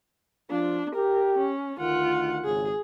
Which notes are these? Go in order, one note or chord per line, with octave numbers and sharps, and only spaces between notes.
F3 D4 F4
G4 A#4
C#4
D2 D#3 F4 F#5
G#1 C#3 G#4